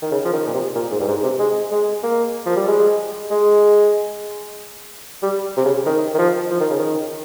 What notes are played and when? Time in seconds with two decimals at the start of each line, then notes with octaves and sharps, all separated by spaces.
0.02 D#3
0.11 C#3
0.25 F3
0.33 D#3
0.47 A#2
0.54 C3
0.75 A#2
0.91 G#2
1.00 G2
1.07 G#2
1.23 C3
1.39 G#3
1.71 G#3
2.03 A#3
2.46 F3
2.56 G3
2.67 G#3
3.31 G#3
5.22 G3
5.57 C3
5.65 C#3
5.86 D#3
6.14 D#3
6.18 F3
6.50 F3
6.60 D#3
6.70 C#3
6.78 D#3